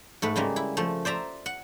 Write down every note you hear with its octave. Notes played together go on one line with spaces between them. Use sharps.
G#2 A3 B4
C#3 G3 G#3 A#3
E4
F3 A3
C5 D5 E5 A#5
F#5